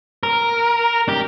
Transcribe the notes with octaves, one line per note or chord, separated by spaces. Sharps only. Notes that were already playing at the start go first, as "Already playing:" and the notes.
A#4
G4